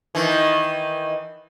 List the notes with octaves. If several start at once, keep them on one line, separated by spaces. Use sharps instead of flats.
D#3 E3